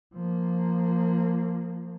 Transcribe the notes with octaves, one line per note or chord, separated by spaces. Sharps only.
F3 A#3